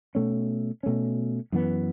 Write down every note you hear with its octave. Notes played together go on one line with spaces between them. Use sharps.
B2 A3 C#4
B2 A3 C#4
F#2 E3 B3